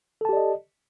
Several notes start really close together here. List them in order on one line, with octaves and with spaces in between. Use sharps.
A4 A5 G4 D5 D#5